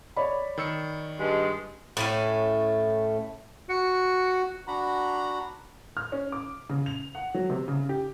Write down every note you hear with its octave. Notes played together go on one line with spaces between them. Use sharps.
C#5 D5 B5
D#3 E6 C#7
G2 G#3
A2 A3 C#4
F#4 C#7
D4 F#4 F#5 A#5 B5
F6
C#4
D6
C#3
F7
F#5
F#3
C3
C#3
G4